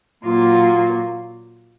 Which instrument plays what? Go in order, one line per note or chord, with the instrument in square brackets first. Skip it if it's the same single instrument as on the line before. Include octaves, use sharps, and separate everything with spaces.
[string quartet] A#2 F#3 A#3 F4